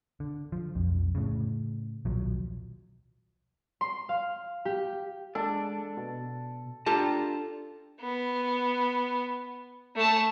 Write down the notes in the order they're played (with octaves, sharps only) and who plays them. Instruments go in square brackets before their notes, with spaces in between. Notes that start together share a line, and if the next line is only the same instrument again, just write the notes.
[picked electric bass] D3
F3
B1 F2
A2 C#3
D#1 B1 F3 F#3
[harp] C6
F5
G4
[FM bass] G#3 [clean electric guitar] D4 [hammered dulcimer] A4
[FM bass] B2
[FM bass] D4 [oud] F4 G4 A4 [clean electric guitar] A5 A#5
[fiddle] B3
A3 A5